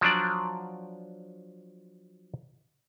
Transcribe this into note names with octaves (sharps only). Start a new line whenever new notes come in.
F3 F#3 D4 D5